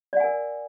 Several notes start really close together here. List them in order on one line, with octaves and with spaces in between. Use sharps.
D5 F#5 G#5 A#4